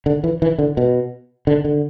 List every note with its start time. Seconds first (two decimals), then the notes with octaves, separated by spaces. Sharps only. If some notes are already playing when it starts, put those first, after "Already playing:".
0.06 D3
0.24 E3
0.42 E3
0.58 D3
0.77 B2
1.47 D3
1.65 D3